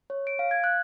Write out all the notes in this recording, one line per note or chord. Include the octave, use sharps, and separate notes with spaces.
C#5
D7
F5
G#6
F#6